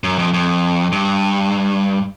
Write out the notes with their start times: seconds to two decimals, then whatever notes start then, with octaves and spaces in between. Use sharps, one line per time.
0.04 F#2
0.18 F2
0.34 F2
0.92 G2